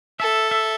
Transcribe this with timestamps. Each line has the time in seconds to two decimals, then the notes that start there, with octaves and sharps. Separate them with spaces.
0.20 A4 E5
0.51 E5